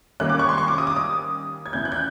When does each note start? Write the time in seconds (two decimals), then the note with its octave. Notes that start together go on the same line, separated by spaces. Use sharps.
0.20 D#3 G3 A#3 C#4 F#6
0.29 D6
0.39 C#6
0.49 C6
0.58 C#6
0.68 D6
0.78 D#6
0.87 D6
0.96 D#6
1.66 G#6
1.73 E2 C#3 E3 G6
1.85 F#6
1.92 G6